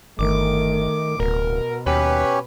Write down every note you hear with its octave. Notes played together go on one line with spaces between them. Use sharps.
G1 D#3 A3 D6
D1 B2 A#4
D#2 C#4 G4 B4 C#5